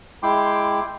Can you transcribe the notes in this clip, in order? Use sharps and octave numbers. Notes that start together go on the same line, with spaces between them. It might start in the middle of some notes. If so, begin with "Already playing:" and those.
G#3 E4 G5 C6 D6